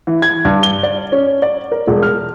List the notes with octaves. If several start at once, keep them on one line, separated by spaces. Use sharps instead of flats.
E3
G#6
G2
G7
D5
C#4
D5
A#4
E1
F6